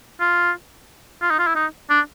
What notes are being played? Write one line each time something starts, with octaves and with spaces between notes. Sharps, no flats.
F4
F4
D#4
F4
E4
D#4
D4